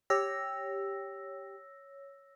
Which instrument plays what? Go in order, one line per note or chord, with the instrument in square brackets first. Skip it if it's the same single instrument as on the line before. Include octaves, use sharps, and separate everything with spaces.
[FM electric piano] G4 [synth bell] C#5 E6 A#6